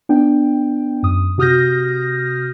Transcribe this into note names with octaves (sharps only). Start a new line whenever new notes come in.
B3 D4 G5
F#2 D#6
C3 F#4 D#6 F6 G6 A#6